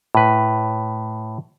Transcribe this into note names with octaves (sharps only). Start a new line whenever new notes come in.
A2 B4